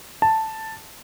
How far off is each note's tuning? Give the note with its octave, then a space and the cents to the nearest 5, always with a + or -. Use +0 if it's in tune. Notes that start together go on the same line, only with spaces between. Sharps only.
A5 +5